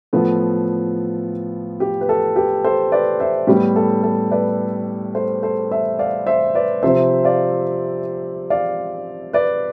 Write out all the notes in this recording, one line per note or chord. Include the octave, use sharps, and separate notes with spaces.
A2 F3 B3 A4
G4
B4
A4
G4 B4
A4 C5
B4 D5
C5 E5
A2 G3 B3 G4
A4
A4
B4 D5
A4 C5
A4 C5
C5 E5
D5 F5
C5 E5
B4 D5
C3 F3 C4 C5 E5
D5 F5
D5 F5
B4 D5